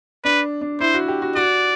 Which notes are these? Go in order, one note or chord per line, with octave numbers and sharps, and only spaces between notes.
D4 B4
D4
E4 C5
F#4
G4
F#4
F#4 D5